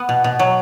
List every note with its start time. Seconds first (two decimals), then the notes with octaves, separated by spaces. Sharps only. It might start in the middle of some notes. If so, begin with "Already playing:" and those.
Already playing: B3
0.09 B2
0.24 B2
0.39 F#3